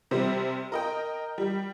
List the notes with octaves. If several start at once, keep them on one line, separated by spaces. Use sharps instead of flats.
C3 G3 C5
A#4 D#5 G5
G3